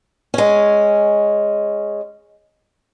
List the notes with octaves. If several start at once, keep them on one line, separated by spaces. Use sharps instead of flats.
G#3 C#4